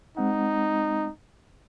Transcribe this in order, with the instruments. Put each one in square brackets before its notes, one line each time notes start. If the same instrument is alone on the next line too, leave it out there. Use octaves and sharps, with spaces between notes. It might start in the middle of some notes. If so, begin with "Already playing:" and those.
[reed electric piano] G#3 C4 F#5 [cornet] D#4